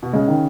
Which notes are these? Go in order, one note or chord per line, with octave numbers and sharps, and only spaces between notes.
B2
C#3 G#3
D#3